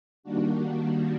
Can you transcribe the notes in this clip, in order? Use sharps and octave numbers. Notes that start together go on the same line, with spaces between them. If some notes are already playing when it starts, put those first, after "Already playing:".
D#3 G3 A#3 D4 F#4